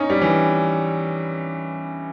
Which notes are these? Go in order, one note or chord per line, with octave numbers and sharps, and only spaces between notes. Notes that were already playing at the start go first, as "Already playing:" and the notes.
Already playing: C#4 D#4
G3
E3